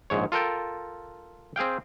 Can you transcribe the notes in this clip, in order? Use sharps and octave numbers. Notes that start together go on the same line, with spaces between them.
A#1 G#2 C#5
F4 A4 A#4 G5
C4 G#4 F5 G5